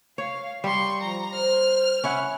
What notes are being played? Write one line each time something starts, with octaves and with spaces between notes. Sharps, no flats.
C#5 F5
G3 C6 C#6
F3 A#5
C5 F6
C#4 E4 F#5